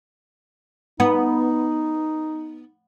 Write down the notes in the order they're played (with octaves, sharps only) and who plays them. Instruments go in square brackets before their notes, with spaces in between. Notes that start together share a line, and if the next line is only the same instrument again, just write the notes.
[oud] B3 [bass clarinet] D#4